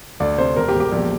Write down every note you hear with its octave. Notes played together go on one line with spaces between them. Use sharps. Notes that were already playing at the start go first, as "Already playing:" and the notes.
D2 D5
C3 C5
E1 A#4
G4
E1
G4
A#1